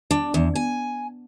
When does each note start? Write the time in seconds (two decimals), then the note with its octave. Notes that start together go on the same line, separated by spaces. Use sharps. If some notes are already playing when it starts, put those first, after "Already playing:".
0.11 D4
0.34 E2
0.55 G#5